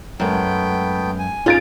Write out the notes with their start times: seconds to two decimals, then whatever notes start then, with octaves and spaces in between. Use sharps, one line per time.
0.20 F#2 G#3 A3 B3 G5
1.19 G#5
1.46 C#4 D#4 F4 G#4 A6 D7